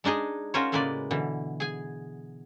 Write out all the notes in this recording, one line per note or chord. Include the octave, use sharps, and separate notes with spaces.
G#3 D4 D#4 G#4 D#5
C#4 F4 F#4 A#4 C5 C#5
A2 C#3 G#3 A#3 B4 D5
B2 D3 E3
G#4 G#5